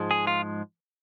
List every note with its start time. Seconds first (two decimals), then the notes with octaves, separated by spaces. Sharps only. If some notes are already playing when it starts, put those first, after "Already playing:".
Already playing: G#2 F3 G#3
0.11 G#4
0.27 F4